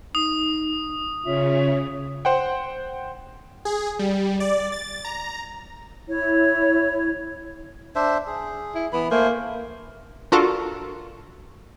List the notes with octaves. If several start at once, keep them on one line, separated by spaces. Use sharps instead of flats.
D#4 D#6
C#3 C#4 F4 C#5 E5
C5 F#5 G5
G#4
G3
D5
A6
A#5
E4 C#5
D4 C5 E5
G#4
E4
E3 B3 B5
A3 A#3 C5 G#5
D4 F4 F#4 A4 A#4